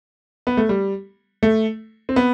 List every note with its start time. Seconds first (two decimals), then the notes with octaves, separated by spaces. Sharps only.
0.47 B3
0.57 A3
0.69 G3
1.43 A3
2.09 C4
2.16 B3